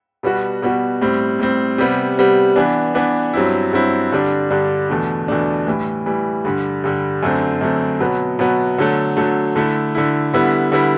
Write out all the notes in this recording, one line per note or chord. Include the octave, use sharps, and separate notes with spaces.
B2 G3 B3 F#4
B2 G3 B3 F#4
A2 G3 C4
A2 G3 C4
C3 G3 B3
C3 G3 B3
E3 B3 D4
E3 B3 D4
G2 F#3 C4 E4
G2 F#3 C4 E4
G2 D3 G3 D4
G2 D3 G3 D4
E2 B2 A3 D4
E2 B2 A3 D4
A2 E3 G3
A2 E3 G3
G2 D3 G3
G2 D3 G3
F#2 D3 A3 C4
F#2 D3 A3 C4
B2 F#3 B3
B2 F#3 B3
D3 F#3 A3
D3 F#3 A3
D3 A3 E4
D3 A3 E4
D3 G3 B3 E4
D3 G3 B3 E4